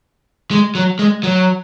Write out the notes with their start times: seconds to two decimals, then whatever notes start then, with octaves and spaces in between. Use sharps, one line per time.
0.51 G#3
0.75 F#3
0.99 G#3
1.23 F#3